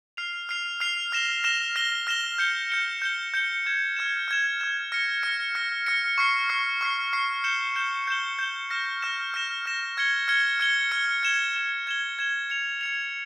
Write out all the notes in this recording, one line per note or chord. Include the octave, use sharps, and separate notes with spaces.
F6 C7 F7
F6 C7 F7
F6 C7 F7
F6 A#6 E7 G7
F6 A#6 E7 G7
F6 A#6 E7 G7
F6 A#6 E7 G7
G6 C#7 G7
G6 C#7 G7
G6 C#7 G7
G6 C#7 G7
F6 G#6 E7
F6 G#6 E7
F6 G#6 E7
F6 G#6 E7
F6 A#6 C#7
F6 A#6 C#7
F6 A#6 C#7
F6 A#6 C#7
C#6 F6 C7
C#6 F6 C7
C#6 F6 C7
C#6 F6 C7
G6 C#7 E7 G7
G6 C#7 E7 G7
G6 C#7 E7 G7
G6 C#7 E7 G7
F6 A#6 E7
F6 A#6 E7
F6 A#6 E7
F6 A#6 E7
F6 G#6 C#7 G7
F6 G#6 C#7 G7
F6 G#6 C#7 G7
F6 G#6 C#7 G7
G#6 E7 G7
G#6 E7 G7
G#6 E7 G7
G#6 E7 G7
G#6 C#7 F7
G#6 C#7 F7